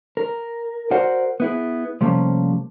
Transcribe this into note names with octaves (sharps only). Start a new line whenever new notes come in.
A#4
F#4 A#4 C5 D5 F#5
B3 E4 G#4
C3 F3 G3 A3 A#3 C#4